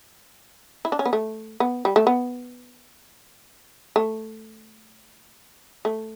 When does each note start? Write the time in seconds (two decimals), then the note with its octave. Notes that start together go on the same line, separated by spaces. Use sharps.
0.85 E4
0.92 D4
0.99 C#4
1.06 B3
1.13 A3
1.60 B3
1.85 G3
1.96 A3
2.07 B3
3.96 A3
5.85 A3